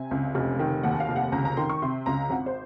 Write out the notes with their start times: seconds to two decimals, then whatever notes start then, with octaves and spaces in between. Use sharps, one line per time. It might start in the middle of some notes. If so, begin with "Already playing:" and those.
Already playing: C3 G#5
0.11 C#2
0.35 F1
0.59 D#3
0.83 D#2 F#5
1.00 F5
1.09 F1
1.16 F#5
1.32 C#2 A#5
1.45 A#5
1.57 D#3 C6
1.69 C#6
1.82 C3 C6
2.06 C#2 A#5
2.30 G#1 F#5
2.46 C5